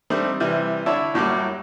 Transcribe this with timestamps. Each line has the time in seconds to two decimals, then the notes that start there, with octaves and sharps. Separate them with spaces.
0.10 G3 A3 C4 D4 D#4
0.40 C3 E3 G3
0.86 D3 D4 E4 C#5 E5 A5
1.14 F#2 A2 F#3 G3 A#3 D6